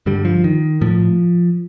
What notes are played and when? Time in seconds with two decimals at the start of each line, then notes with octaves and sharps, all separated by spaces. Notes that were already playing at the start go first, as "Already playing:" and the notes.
0.06 G2 D3 G3
0.25 F3
0.44 D#3
0.81 A2 F3